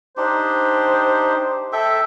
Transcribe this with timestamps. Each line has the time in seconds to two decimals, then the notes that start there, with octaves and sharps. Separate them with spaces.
0.17 D4 D#4 G4 C5
1.72 A4 E5 G5